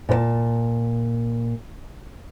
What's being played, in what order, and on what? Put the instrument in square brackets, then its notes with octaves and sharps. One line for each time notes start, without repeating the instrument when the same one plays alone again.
[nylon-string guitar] A#2 B4 A5